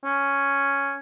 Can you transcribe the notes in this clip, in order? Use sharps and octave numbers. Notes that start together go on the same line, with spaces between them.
C#4